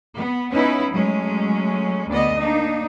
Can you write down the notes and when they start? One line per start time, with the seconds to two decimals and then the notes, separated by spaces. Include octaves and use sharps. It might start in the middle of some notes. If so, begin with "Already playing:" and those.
0.16 B3
0.53 B3 C#4 D#4 E4 B4
0.93 F#3 G#3 A3 C#4
2.09 D2 B3 D5 D#5
2.38 A#3 D4 D#4